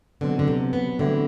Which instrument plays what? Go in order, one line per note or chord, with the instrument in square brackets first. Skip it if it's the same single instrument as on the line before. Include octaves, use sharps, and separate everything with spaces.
[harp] B2 F#3 C4 [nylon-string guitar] D3
[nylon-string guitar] D3
C3
B3
[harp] A2 E3 G3 C4 F#4 [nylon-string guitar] D3